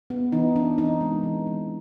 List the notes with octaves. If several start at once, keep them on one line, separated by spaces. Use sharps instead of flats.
B3
E3 D#4
E3 D4
C4 D#4
G#3
E3
E3